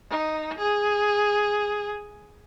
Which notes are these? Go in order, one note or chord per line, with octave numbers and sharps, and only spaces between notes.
D#4
G#4